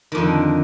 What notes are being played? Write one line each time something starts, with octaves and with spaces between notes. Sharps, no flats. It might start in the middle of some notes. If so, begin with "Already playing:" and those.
F2 D3 D#3